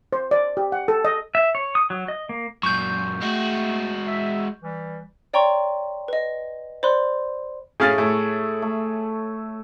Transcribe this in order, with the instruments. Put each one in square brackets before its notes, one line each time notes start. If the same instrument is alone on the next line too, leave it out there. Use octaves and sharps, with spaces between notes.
[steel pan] C5
D5
G4
F#5
A4
D#5
[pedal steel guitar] E5
C#5
D#6
F#3
D#5
A#3
[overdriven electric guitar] F#2 A#2 [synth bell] C#6 G6
[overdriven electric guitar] G#3 F#4 [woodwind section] A3
[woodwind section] E5
E3 G3
[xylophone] C#5 D5 G5 A#5 C6 C#6
B4 D#5
C5 D5 B5 C6 F#6
[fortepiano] A2 C#4 F5 [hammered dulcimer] A3 [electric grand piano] G#4 A6
[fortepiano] A2 [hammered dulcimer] A4 C#5 E5
[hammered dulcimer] A3